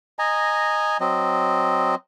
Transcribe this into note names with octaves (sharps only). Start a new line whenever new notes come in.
D#5 G#5 A#5
F#3 C4 D#5